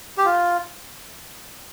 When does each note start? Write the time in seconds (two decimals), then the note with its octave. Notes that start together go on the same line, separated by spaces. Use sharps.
0.17 G4
0.25 F4